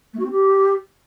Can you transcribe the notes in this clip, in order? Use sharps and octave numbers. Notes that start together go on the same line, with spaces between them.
A3
F#4
C4
G4